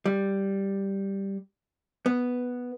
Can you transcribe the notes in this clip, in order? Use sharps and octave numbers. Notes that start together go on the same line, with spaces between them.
G3
B3